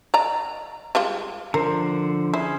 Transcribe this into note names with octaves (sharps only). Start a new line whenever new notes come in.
D5 D#5 A#5
G3 G#3 F4
D3 F3 A#4 C5
C#4 E4 G#4 C5